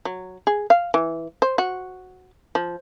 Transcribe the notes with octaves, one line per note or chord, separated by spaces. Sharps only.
F#3
G#4
F5
E3
C5
F#4
F3